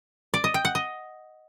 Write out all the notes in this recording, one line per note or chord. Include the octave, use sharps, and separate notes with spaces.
D5
D#5
G5
F#5
D#5